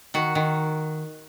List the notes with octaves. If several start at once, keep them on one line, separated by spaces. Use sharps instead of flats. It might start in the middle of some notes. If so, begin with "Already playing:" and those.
D#3 F#4
D#3